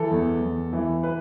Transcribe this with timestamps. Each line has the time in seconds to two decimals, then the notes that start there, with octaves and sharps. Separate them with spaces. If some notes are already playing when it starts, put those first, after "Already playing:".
Already playing: E3 A4
0.11 E2
0.41 E2
0.73 E3
1.03 B4